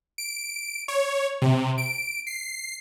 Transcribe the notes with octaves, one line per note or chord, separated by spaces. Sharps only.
D7
C#5
C3
D7
C7